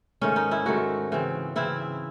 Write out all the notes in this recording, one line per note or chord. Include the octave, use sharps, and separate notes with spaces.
G#2 D#3 A3 C#4
D#4
E4
G#2 D#3 A3 F#4
C#3 E3 C4
C#3 E3 C4 E4